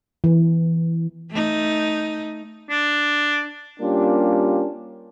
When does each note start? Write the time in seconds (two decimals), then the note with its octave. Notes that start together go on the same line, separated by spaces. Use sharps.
0.24 E3
1.30 A3 D#4
2.70 D4
3.80 G3 A#3 C#4 D4 F4 G4